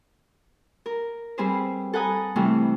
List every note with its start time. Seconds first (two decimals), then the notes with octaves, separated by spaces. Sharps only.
0.86 A#4
1.38 G3 C4 G4 G#4 B4 C5
1.93 A4 B4 F#5 G#5 A#5 D#6
2.36 C3 E3 G3 A3